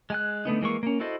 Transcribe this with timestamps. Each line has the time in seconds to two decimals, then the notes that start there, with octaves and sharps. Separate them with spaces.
0.10 G#3 G#5 F#6
0.45 D3 A3 B3 D#4
0.61 E3 G#3 A#3 C#6
0.83 A#3 C#4
1.00 E4 F#4 A4 C5 D#5